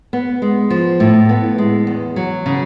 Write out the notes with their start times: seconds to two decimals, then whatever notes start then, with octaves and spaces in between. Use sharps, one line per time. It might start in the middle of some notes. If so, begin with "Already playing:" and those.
0.13 B3
0.42 G#3
0.70 F3
1.00 A2
1.29 B3
1.58 G#3
1.87 E2
2.16 F#3
2.46 C#3